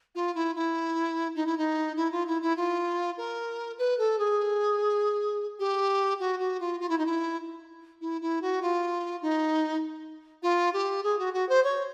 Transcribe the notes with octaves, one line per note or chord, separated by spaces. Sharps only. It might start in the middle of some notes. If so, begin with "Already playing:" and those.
F4
E4
E4
D#4
E4
D#4
E4
F4
E4
E4
F4
A#4
B4
A4
G#4
G4
F#4
F#4
F4
F4
E4
D#4
E4
E4
E4
F#4
F4
D#4
F4
G4
G#4
F#4
F#4
C5
C#5